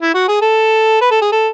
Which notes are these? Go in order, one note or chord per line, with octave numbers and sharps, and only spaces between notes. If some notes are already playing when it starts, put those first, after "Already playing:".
E4
F#4
G#4
A4
B4
A4
G#4
A4